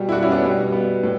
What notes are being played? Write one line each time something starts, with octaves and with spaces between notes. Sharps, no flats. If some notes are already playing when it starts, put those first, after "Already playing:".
Already playing: B2 G3
E4
D4 F#4
C#4 E4
B3 D4
B2 G3
B3
A2